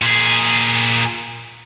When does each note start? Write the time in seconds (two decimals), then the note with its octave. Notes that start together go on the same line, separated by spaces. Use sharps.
0.02 A#2 G#4